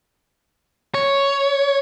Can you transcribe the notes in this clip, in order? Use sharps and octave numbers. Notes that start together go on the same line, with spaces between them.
C#5